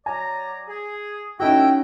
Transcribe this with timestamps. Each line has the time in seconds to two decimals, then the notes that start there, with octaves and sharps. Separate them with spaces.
0.06 F#3 D5 G#5 A#5
0.68 G#4
1.40 A3 C#4 D#4 E4 F#4 G5